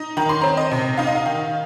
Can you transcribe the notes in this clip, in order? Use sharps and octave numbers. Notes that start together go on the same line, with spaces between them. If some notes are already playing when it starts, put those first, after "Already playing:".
Already playing: D#4
D#3 A#5
C6
C4 A#5
D#5
C3
D#4 F5
D#5
F5
D#3